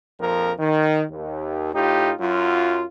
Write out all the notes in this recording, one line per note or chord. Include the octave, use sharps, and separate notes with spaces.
A#1 F2 F3 A#4
D#3
D#2
A2 D#4 F4 G4
F#2 F#3 F4